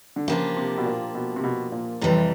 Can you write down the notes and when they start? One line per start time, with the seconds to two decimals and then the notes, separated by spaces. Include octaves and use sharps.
0.16 D3
0.28 C#3 F3 A#3 D4 G4
0.56 C3
0.78 B2
0.86 A#2
1.15 B2
1.36 C3
1.44 B2
1.72 A#2
2.01 F2 A2 C3 E3 G3